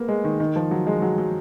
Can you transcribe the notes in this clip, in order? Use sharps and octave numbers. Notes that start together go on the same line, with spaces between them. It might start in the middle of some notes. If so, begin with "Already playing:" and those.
Already playing: A#3 B3
G#3
D#3
D#3
F3
F#3
G#3
F#3
F#3